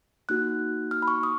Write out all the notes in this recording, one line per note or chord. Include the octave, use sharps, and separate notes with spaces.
A#3 D#4 F#4 F#6
F6
B5
C#6
D#6